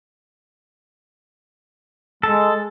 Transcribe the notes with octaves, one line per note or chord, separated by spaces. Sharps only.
G#3 A4